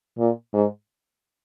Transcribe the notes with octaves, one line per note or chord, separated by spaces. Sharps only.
A#2
G#2